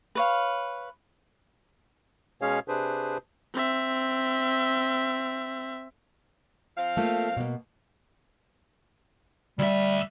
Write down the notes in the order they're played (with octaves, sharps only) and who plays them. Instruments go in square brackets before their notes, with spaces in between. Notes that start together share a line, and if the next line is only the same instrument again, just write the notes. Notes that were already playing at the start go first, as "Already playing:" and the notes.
[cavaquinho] B4 C#5 F5
[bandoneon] B2 G#3 C#4 G#4 C#5 F5
C3 D4 G#4 B4 C5
[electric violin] C4 E5
[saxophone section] F3 C4 F5
[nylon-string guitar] A3 A#3 F4
B2 A#3
[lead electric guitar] D2 E5 [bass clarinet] G3